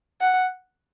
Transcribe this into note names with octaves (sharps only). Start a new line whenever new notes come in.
F#5